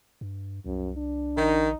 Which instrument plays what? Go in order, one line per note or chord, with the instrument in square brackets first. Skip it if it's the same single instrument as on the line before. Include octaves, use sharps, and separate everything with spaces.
[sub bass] G2
[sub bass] C2 [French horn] F#2
[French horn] D4
[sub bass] A#1 [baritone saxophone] D#3 [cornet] D#4